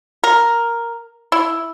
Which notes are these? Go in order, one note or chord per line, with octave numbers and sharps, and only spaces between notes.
A#4
E4